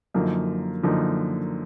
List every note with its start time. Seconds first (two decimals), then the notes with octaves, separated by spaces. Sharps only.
0.14 F#2 D3 F3 A#3 D#4
0.83 F#2 D3 F3 A#3 D#4